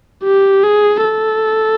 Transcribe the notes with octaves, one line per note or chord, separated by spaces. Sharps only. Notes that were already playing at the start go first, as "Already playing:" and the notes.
G4
G#4
A4